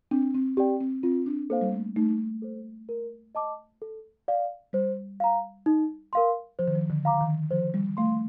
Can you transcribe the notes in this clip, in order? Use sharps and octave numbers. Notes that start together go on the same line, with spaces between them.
C4 D4
C4
C4 G4 D5 G5
C4
C4 F4
D4
A#3 A4 C5 F5
G3
A3
A3 D#4
A4 C5
A#4
D#5 A5 D6
A4
D5 F5
G3 C5
F5 A#5
D#4
A#4 F5 C6
F3 C5
D#3
F3
D3
F5 A#5 D6
D#3
F3 C5
G3
A3 F5 C6